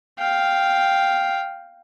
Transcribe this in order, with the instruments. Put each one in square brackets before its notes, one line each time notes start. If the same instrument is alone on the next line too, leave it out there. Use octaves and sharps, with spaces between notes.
[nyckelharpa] F5 G5